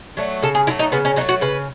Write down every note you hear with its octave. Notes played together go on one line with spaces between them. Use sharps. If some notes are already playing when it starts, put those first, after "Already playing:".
F#3 A3
C#3 A4
G#4
F#3 A3 E4
D#4
C#3 B3
C#4
F#3 A3 D#4
F#4
C#3 B4